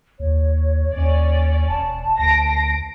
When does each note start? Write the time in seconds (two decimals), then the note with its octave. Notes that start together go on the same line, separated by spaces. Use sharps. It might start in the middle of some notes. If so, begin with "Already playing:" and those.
0.20 D#2 C#5
0.93 D#2 C#4 D5
1.69 E1 A5
2.19 D2 A#6 C7 D7